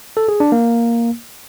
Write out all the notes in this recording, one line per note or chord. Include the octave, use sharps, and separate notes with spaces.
A4
G#4
D4
A#3